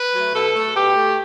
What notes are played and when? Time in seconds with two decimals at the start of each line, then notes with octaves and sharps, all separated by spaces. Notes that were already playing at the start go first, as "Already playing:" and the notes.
Already playing: B4
0.14 F#3 A3
0.34 B2 A4
0.55 A3
0.75 B2 G4
0.95 A3